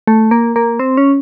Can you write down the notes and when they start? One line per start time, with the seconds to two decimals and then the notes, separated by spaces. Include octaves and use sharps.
0.07 A3
0.31 A#3
0.56 A#3
0.79 C4
0.97 C#4